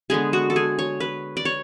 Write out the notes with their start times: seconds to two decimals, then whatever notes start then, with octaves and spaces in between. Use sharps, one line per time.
0.10 D3 G#3 B3 G#4
0.33 F#4
0.50 A4
0.56 G#4
0.79 C#5
1.00 B4
1.37 D5
1.45 C#5